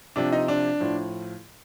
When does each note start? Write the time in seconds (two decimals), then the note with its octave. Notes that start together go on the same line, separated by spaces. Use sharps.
0.16 C3 F3 D4
0.32 D#4
0.48 D4
0.80 A2 F3